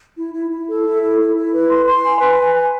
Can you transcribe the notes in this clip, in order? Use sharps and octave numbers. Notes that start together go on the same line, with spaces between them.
E4
E4
E4
A4
E4
A4
E4
E4
B4
C6
C6
G#5
B4
G#5
G#5